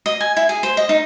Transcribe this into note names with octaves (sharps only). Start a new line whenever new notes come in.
D#5
G#5
E4
G#4
C5
D#5
D#4